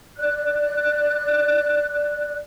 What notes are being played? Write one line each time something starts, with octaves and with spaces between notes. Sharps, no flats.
D5 F#6